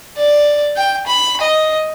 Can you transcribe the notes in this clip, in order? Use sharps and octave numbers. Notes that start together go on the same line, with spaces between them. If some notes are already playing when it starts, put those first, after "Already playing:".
D5
G5
B5
D#5